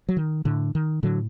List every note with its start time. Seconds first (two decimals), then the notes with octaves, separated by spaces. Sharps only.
0.09 F#3
0.17 D#3
0.45 A2 D3
0.75 D#3
1.03 A2 D3 F#3